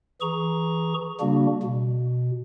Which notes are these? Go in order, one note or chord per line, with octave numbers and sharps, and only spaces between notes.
E3 G#4 A#5 C#6
C#3 G3 A#3 D4 F#4
B2